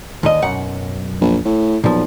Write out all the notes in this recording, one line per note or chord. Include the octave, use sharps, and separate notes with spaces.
D#2 A#2 D#5
B1 F#2 F#5
A#1
A2
B1 A#2 F3